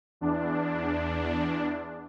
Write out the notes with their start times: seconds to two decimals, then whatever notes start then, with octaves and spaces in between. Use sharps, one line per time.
0.21 E2 D4